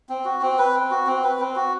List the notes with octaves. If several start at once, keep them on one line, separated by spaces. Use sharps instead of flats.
C4
F#4
C4
B4
C4
F#4
C4
B4
C4
F#4